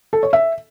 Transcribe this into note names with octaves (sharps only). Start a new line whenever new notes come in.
A4
C#5
E5